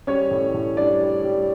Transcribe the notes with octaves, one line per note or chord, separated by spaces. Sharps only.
G3 C#4 C#5
A2
A2
G3 D4 D5
G3
G3